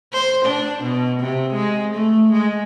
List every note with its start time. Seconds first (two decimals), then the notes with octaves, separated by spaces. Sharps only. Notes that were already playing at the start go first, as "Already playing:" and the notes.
0.13 C5
0.46 D4
0.83 B2
1.21 C3
1.54 G#3
1.95 A3
2.33 G#3